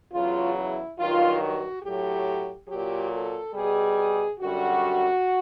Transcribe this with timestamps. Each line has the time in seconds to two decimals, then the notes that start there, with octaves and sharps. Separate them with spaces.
0.12 E2 C#3 F#3 F4
0.55 E4
0.97 G2 D#3 F#3 F4
1.40 F#4
1.82 A2 F#3 G4
2.68 A#2 F#3 G4
3.12 A4
3.54 B2 G3 G#4
4.40 F#2 D3 G3 F#4